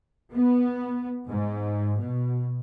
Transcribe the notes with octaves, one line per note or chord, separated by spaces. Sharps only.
B3
G#2
B2